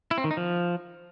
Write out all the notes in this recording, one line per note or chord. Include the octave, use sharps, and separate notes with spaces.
E4
C4
D#3
D#4
F3